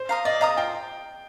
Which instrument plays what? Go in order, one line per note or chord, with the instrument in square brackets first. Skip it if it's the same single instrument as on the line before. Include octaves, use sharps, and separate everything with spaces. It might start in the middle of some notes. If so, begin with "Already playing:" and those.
Already playing: [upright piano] C5
[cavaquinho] F5 A#5 D#6
[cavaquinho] D5 [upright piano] D#5
[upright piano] D#5 [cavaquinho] F5 A#5 D#6
[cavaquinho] F4 [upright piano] G5